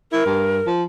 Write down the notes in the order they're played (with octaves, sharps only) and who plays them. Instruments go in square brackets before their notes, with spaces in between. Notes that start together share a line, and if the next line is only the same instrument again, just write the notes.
[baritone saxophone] E4 [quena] A#4
[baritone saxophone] G2
F3